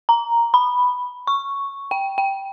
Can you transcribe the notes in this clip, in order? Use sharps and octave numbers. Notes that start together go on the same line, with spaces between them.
A#5
B5
C#6
G5
G5